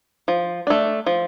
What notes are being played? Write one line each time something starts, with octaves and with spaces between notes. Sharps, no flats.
F3
A3 D4
F3